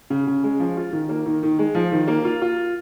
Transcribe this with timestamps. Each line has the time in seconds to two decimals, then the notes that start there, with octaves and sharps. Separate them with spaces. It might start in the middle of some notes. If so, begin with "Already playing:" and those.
0.10 C#3
0.27 C#3
0.43 G#3
0.60 F3
0.77 F4
0.93 D#3
1.09 A#3
1.26 D#3
1.43 D#3
1.59 G#3
1.75 F3
1.92 D#3
2.08 A#3
2.25 F4
2.42 F4